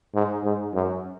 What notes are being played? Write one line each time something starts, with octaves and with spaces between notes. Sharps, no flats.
G#2
G#2
F#2